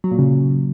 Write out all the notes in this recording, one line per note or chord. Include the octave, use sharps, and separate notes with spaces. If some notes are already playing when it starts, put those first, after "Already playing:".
F#3
A#2
C#3